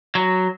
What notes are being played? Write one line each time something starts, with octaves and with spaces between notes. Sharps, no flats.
F#3